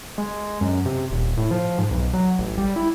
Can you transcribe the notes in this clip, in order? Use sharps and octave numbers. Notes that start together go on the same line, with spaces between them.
G#3
F#2
C3
D#1
A2
F3
G#2
B1
F#3
A1
G3
E4